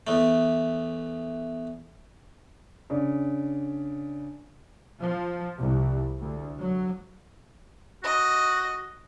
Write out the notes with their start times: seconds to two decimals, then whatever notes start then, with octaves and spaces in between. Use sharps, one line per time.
0.07 E2 A3
2.90 C#3 D4
5.01 F3
5.58 C2
6.18 D2
6.60 F#3
8.03 F#4 D#5